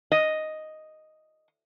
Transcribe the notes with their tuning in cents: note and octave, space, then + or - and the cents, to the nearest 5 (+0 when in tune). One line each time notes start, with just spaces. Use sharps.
D#5 +0